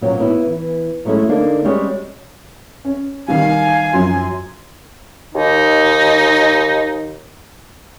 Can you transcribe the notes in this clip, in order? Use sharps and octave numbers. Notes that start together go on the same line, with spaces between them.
A#2 F#3 C4 C#4
B3 E4
E3
F#3 G#3 A3 C#4 E4
D3 A#3 D4 D#4
G3 G#3 C4 C#4 F#4 G4
C#4
D#3 G3 F5 G#5
F#2 F3 F#3 C6
D#2 D#4